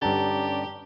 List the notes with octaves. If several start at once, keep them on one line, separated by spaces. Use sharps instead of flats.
G2 D3 C#4 G4 D5 A5 A#5 A6